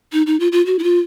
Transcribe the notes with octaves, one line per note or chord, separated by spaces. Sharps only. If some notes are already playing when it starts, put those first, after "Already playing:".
D#4
D#4
F4
F4
F#4
E4
F4